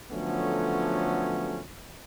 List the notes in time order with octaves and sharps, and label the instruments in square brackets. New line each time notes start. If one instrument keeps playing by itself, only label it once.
[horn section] D3 F3 F#3 A3 B3 C#4